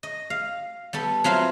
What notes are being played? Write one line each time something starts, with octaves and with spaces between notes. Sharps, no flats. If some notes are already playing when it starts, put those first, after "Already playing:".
D#5
F5
G3 B3 A4
F#3 C4 F4 B4 E5 F5